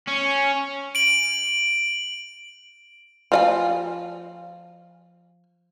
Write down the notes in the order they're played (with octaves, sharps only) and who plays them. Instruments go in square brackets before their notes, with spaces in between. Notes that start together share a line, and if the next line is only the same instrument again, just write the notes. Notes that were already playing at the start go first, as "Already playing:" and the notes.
[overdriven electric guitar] C#4
[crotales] D7 F#7
[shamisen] F3 D#5 G#5